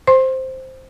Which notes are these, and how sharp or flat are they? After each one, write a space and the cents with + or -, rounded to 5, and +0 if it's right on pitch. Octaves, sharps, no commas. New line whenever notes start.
C5 +0 C6 +30